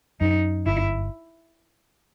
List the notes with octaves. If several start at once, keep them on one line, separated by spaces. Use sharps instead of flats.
F#2 D#4
G1 E4